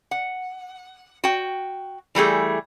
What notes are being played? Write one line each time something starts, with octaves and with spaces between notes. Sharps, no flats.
F#5
F#4 G5
E3 G3 A3 G#4